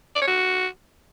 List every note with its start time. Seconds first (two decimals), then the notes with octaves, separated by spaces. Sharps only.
0.15 D5
0.21 C#5
0.27 F#4